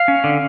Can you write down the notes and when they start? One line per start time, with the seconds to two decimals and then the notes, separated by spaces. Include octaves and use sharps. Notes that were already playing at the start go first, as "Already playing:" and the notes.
Already playing: F5
0.08 C#4
0.24 D3